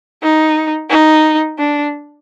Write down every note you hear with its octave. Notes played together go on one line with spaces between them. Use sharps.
D#4
D#4
D4